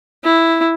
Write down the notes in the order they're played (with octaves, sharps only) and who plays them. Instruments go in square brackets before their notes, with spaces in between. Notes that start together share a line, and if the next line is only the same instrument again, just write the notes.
[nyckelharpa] E4